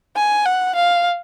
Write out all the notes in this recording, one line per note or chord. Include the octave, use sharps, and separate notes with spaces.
G#5
F#5
F5